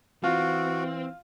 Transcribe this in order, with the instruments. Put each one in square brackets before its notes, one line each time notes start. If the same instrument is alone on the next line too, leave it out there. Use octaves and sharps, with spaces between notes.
[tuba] E3 [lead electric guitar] C4 [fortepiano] F4 [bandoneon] F#4